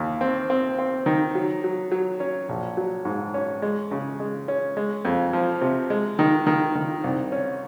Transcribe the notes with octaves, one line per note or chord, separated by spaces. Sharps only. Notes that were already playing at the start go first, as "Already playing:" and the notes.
Already playing: D#2
C4
C4
C4
D#3
F#3
F#3
F#3
C#4
A#1
F#3
G#2
C#4
G#3
C#3
G#3
C#4
G#3
F2
F3
C3
G#3
D#3
D#3
D#3
C2
C#4